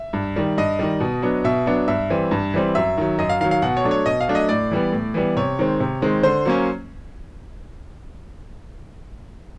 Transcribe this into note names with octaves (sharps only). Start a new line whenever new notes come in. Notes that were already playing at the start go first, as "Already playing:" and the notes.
Already playing: E5
G2
D#3 G3
G2 D#5
D#3 G3
B2
F#3 B3 D4
B2 E5
F#3 B3 D4
G2 E5
E3 G3 C4
G2
E3 G3 C4
F#2 E5
D#3 F#3
F#2 D#5
F5
D#3 F#3 F5
F5
B2 F#5
C#5
F#3 A3 D4
C#5
B2 D#5
F5
F#3 A3 D4
D#5
A2 D5
E3 G3 B3
A2
E3 G3 B3
C3 C#5
D#3 G#3 C4
C3
D#3 G#3 C4
D3 C5
F#3 A#3 C#4